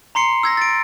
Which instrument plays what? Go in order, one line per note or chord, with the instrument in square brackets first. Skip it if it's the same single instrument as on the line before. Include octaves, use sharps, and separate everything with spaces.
[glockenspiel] A#5 C6 C7 C#7
E6 G#6 A#6
A6 D7